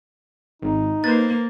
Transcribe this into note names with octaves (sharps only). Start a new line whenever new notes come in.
G#1 D#4
A#3 B4 C5 A6